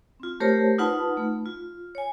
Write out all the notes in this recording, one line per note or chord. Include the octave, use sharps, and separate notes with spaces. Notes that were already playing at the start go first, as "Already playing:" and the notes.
C4 F4
A3 G4 A#4 C5 C#5 A5
D#4 F4 B4 F#5 A5 B5
A3
F4
C#5 G#5